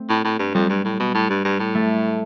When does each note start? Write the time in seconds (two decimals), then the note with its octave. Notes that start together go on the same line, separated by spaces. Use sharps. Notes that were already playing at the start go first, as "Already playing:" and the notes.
Already playing: A3 C4
0.09 A2
0.24 A2
0.39 G2
0.54 F2 G3
0.69 G2
0.84 A2
1.00 B2
1.14 A2
1.30 G2
1.45 G2
1.60 A2
1.75 A3